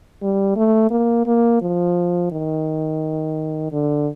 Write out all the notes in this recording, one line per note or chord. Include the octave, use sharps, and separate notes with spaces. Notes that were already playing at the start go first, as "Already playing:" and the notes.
G3
A3
A#3
A#3
F3
D#3
D3